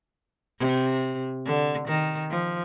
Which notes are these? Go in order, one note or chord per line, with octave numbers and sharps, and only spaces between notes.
C3
D3
D#3
F3